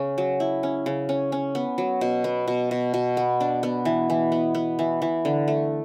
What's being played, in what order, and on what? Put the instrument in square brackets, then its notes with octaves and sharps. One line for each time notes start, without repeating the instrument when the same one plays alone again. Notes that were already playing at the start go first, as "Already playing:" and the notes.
Already playing: [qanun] C#3 C#4
F#3
E4
C#4
C#3
C#4
C#4
B3
F#3
B2
B3
B2
B2
B2
B3
D4
B3
E3
E3
B3
B3
E3
E3
D3
A3